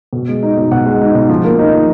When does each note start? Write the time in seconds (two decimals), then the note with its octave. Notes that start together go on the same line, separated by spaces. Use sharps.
0.13 B2
0.28 G#3
0.43 D#4
0.57 B2
0.72 B2 F#5
0.86 G#3
1.01 D#4
1.15 B2
1.29 F3
1.44 A#3
1.59 D#4
1.73 F3